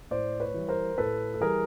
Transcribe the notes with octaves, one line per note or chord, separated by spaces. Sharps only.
A2 C5 D5
B4 C#5
E3 G3
A#4 C5
A2 A4 B4
A4
E3 G3 G#4 A#4